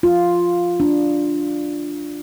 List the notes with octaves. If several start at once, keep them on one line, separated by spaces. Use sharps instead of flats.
F4
D4